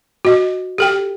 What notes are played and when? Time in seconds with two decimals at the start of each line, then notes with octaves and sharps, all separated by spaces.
0.25 F#4 D#5
0.78 G4 A4 G5